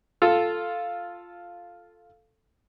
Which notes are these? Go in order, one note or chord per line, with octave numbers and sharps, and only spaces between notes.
F4 A4